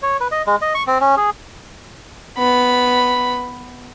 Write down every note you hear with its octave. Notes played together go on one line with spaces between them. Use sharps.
C#5
B4
D#5
G#3
D#5
C#6
C4
C#4
G#4
B3 B5